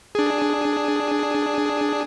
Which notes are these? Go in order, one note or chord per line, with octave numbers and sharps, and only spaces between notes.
D4 G#4